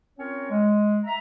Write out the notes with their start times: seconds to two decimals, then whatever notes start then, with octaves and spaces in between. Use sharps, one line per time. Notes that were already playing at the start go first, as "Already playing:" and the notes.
0.18 C4 C#4 F4 A#4 C#5
0.50 G#3
1.04 E5 A#5